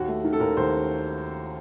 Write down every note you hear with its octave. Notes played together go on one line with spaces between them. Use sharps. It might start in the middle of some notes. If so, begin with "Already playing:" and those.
Already playing: D#2 F#4
A3
D#3
A4
D#2 A#4
D#2 C5